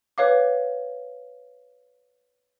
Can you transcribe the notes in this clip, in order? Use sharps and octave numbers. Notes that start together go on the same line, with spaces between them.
B4 C#5 F5 D6